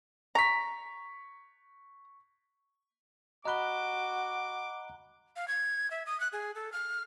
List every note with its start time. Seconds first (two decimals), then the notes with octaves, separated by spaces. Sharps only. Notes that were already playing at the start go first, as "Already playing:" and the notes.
0.35 A#5 C#6 B6
3.45 F#4 D#5 A#5 B5 D6 F#6 G7
5.36 F5
5.48 G#6
5.91 E5
6.06 D#6
6.20 F#6
6.33 G#4
6.55 A4
6.72 F6